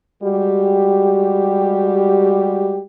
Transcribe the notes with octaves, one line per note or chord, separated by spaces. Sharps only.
G3 G#3 F#4 G4